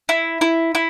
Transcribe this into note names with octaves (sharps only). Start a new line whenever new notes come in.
E4
E4
E4